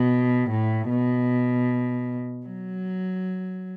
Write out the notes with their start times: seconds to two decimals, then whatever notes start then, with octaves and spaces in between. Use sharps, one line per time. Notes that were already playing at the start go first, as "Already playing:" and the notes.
Already playing: B2
0.49 A2
0.89 B2
2.47 F#3